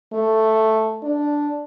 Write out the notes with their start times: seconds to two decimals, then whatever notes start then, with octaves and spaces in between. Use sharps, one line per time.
0.13 A3
1.03 D4